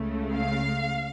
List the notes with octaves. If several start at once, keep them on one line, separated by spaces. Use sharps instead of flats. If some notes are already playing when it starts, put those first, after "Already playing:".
Already playing: C#2 C#3 A3
F5